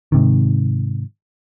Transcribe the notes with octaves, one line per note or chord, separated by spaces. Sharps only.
G#2 C3 D#3